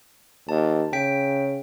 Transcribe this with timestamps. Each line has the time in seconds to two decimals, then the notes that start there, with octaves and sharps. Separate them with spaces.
0.49 D#2 A5
0.93 C#3 G5 B6 D7